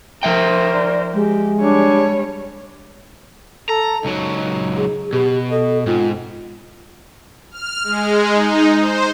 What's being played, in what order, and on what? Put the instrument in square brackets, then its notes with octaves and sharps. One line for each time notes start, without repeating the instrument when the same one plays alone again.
[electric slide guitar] F3 E5 G5 [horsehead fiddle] A#4 C5
[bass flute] D5
[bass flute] G#3 [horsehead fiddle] G4
[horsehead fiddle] G3 C#5 [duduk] D4
[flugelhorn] A4 [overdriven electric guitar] A#5
[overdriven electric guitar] C#2 F#3 [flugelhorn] D#4
[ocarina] G#4
[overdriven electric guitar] B2 [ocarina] G4
[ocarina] A4 [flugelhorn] D#5
[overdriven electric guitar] G#2 [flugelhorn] C4 [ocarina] F4
[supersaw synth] F6
G#3
D#4
C5